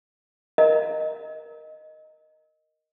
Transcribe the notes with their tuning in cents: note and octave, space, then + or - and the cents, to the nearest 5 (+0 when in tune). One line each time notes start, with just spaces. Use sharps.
A#4 +0 D#5 +0